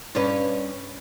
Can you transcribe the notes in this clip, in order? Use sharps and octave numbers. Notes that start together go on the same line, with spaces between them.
G2 C#4 B4